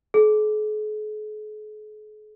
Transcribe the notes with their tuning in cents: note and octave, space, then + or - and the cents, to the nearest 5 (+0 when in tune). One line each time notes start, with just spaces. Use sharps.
G#4 +45